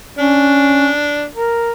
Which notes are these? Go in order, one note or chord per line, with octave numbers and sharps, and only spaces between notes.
C#4 D4
A#4